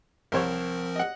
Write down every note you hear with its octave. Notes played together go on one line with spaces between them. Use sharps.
C2 F3 C4 A#4 C5 C#5
D#5 F#5